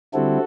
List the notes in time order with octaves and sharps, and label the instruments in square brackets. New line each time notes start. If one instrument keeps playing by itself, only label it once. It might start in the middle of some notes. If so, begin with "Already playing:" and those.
[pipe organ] D3 G3 C4 E4 F#4 A4